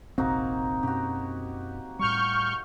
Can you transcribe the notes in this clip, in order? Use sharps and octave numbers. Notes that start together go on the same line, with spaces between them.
F1 A#1 C3 A#3 C4 D#4 F#4
F#2 B2 C#4 F#4 G4
A2 G3 C#6 F6 G6